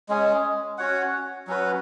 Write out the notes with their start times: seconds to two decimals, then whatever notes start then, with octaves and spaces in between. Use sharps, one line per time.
0.09 G#3 C#4 G#4
0.78 C#4 F#4 C#5 F#5
1.47 F#3 C#4 F#4 B4